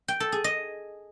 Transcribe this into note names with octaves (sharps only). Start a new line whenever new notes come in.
G5
A4
G#4
D#5